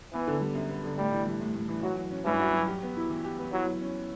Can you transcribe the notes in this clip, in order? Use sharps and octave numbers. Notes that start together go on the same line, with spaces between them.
E3 B3
D3
G3
F#2
B3
D3
A2 G3
E3
G3
A2
A2
E3
F#3 F#4
F#3
C#4
G2 E3
F#4
F#3
G4
B3
E4
E3
G4
B3
F#3 E4
F#3
C#4